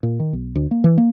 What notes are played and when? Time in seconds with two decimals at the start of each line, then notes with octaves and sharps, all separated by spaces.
0.03 A#2
0.20 D#3
0.33 B1
0.56 D2
0.71 A#3
0.84 E3
0.98 A#3